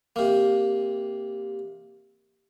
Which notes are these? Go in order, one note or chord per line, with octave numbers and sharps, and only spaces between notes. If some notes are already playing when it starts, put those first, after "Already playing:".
C3 A#3